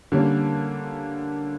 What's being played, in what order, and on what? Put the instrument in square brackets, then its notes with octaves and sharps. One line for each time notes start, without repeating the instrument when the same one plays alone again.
[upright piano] D3 G3 A#3 C#4